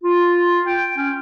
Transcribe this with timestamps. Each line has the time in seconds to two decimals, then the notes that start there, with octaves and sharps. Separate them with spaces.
0.03 F4
0.67 G5
0.97 C#4